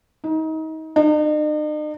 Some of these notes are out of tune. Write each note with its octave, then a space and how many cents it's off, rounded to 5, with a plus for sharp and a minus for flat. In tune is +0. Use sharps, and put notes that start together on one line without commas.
D#4 +30
D#4 -45